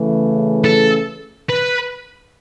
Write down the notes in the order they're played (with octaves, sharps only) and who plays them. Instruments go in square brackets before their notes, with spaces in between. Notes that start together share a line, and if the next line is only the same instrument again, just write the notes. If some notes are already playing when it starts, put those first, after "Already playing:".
Already playing: [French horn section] C#3 E3 A3
[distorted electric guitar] A4
B4